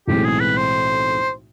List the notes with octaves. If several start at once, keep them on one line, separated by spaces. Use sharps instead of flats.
B1 A2 E3 G#3 C4 G4
G#4
B4
C5